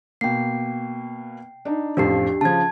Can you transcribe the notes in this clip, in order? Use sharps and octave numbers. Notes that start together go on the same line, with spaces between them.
B2 A#3 G5 C7
D4 D#4
A1 F2 F3 D4 G4 C7
C#3 F3 A5 G#6